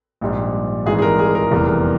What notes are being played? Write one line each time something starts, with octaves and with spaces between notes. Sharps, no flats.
A#1 G#2 G3
G#1 G#2 E3 G3 G#4
G#4
A#4
G#4
A#4
F1 E2 E3 G3